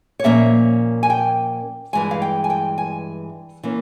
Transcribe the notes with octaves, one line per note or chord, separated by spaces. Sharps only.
C#5
A#2 F3 A#3 C#4 E5
G#5
G5
G2 E3 G#3 G#5
F5
G5
G#5
G5
G#5
E3 A#3 C#4